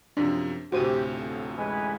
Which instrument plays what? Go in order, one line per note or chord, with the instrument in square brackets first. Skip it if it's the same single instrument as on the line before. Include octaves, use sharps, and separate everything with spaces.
[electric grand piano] F#2 C3 F3 [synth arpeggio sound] D4
[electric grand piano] D2 A2 C3 [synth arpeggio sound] F#4 C5 D#7 [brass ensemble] G4
[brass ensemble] B1 F2
[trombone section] A1 G#3 B4 [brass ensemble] E3 G#5